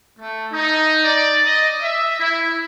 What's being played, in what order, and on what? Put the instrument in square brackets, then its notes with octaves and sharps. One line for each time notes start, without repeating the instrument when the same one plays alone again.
[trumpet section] A3
D#4
D5
D#5
E5
E4